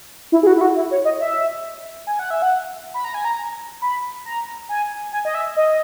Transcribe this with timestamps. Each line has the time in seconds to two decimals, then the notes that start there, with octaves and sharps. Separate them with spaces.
0.32 E4
0.43 G#4
0.47 F#4
0.56 E4
0.61 F#4
0.76 E4
0.91 C#5
1.05 D#5
1.20 E5
2.07 G#5
2.19 F#5
2.31 E5
2.42 F#5
2.94 B5
3.04 A#5
3.14 G#5
3.25 A#5
3.82 B5
4.25 A#5
4.69 G#5
5.12 G#5
5.25 D#5
5.35 E5
5.57 D#5